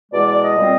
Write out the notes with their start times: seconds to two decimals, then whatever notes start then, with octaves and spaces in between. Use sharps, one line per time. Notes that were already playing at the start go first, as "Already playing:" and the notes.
0.12 E2 B2 G#3 D5
0.27 D5
0.43 D#5
0.58 A#2 G3 C4